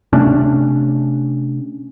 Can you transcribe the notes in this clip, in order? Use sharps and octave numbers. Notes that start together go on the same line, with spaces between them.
C3 A3 C#4 D4